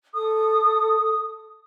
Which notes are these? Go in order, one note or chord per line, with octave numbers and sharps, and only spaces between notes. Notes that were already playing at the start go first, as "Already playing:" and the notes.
A4 D#6